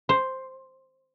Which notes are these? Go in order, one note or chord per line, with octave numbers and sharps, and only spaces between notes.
C5